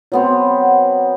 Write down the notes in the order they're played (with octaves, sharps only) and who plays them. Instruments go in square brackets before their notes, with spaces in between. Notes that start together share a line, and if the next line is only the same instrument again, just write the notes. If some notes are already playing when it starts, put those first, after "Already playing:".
[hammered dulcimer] F#3 B3 C4